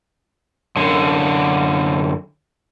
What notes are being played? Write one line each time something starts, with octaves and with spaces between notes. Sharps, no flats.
F#2 D3